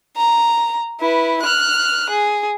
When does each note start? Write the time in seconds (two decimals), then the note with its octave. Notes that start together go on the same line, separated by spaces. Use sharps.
0.17 A#5
1.00 E4 B4
1.43 F6 F#6
2.10 G#4